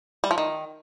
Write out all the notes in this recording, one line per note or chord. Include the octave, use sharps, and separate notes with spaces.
G3
F3
D#3